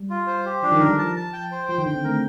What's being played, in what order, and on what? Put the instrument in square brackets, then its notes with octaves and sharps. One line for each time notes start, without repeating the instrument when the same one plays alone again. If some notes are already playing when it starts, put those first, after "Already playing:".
Already playing: [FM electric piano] G3
[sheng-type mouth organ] F4
C5
G4
[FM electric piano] F3 [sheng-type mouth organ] D4
[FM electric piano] D#3
[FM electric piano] D3 [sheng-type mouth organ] A#4
[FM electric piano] G3
[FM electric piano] F3 [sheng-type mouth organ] A5
[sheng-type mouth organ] A5
G5
C5
[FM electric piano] F3 [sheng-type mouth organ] G5
[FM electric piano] D#3
[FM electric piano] D3 [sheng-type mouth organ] G5
[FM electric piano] C4
[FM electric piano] A3 [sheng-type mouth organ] A#4